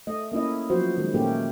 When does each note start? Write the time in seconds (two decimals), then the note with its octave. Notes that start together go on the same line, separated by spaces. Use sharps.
0.07 A3 D#5
0.32 A#3 C#4 E4 D#5
0.70 F3 F#3 B3 F#4 C5
0.98 D#3 G#3
1.14 A#2 A3 A#3 C#4 G4